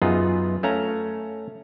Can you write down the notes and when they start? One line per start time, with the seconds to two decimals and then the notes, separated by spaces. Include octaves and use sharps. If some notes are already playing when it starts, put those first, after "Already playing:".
0.02 F#2 B3 D#4 F4 G#4
0.63 A3 C#4 F5 A#5